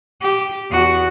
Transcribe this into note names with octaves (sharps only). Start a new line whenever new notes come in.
G4
E2 F#4